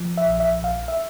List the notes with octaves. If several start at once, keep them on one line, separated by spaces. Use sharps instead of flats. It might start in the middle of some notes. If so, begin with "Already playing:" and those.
Already playing: F3
E5
A#1
E5
A#1
F5
E5